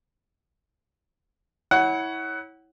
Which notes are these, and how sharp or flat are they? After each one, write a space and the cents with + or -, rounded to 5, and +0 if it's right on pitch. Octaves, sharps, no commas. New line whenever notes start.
E4 -25 C#5 +0 F#5 +15